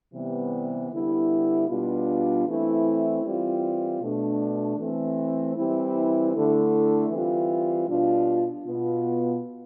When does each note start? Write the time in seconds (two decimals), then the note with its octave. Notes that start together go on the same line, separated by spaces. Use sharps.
0.14 C3 E3 G3 B3
0.92 D3 G3 B3 E4
1.68 B2 G3 B3 D4 F4
2.46 E3 A3 C4 E4
3.23 E3 G3 C4 F4
4.01 B2 A3 D4
4.78 E3 A3 C4
5.55 E3 G3 C4 E4
6.32 D3 A3 E4
7.10 E3 G3 C4 F4
7.87 B2 G3 D4 F4
8.64 B2 B3 F4